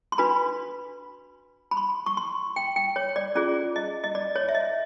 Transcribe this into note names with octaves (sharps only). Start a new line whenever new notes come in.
C6
D4 F#4 B4 B5
B5
C6
C#6
C6
G5
G5
C#5
D5
C#4 F4 G#4 D5
D#5
D#5
D5
C#5
E5
D#5